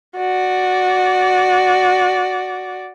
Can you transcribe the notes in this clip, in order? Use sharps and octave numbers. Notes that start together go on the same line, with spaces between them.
F#4 D5